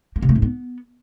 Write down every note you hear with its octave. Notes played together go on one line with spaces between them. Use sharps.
A#3
C3
A3
G#2
B3